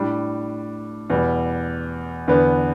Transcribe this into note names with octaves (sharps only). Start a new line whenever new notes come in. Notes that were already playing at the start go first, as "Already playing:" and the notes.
Already playing: A2 G3 D4
E2 B2 G3
E2 D3 B3